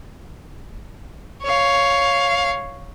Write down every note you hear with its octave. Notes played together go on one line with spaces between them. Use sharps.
C#5 F5